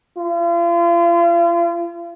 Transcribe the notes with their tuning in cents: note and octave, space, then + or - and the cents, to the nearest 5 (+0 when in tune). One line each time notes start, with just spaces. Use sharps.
F4 -40